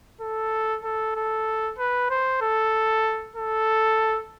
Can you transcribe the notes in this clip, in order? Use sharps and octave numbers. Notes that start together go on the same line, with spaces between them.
A4
A4
A4
B4
C5
A4
A4